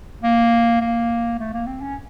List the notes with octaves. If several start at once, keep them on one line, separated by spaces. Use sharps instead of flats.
A#3
A#3
A3
A#3
C4
C#4